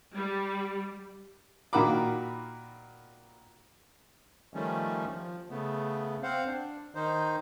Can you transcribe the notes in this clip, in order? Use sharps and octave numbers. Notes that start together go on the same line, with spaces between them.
G3
A#2 D#3 F#4 A#4 B5 D6
D#3 F3 G3 A3 C#4
F3
C#3 A3 B3
C4 C5 F5 F#5
D4
D#3 D#4 C5